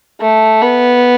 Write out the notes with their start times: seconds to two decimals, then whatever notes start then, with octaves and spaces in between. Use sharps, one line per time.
0.21 A3
0.63 B3